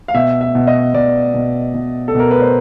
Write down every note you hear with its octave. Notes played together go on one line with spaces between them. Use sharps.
F5
B2 E5
E5
B2
D#5
B2 D5
B2
B2
A4
B2 A#4
B4
C5